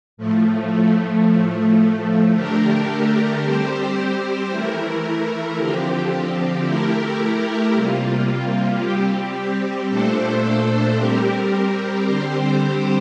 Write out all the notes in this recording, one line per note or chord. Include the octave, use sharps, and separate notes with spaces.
A2 F3 A3
A2 F3 A3
D3 A3 D4 G4 A#4
G3 C4 G4 C5
E3 A3 E4 A#4
D3 F3 C4 G4
A3 E4 G4 A#4
C3 G3 A#3 F4
G3 C4 G4
A#2 A3 D4 A4 C5
G3 C4 G4 A#4
D3 G3 C4 G4 C5